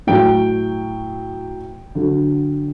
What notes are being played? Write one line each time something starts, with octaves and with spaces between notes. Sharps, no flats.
A2 F#3 G5
D3 F#3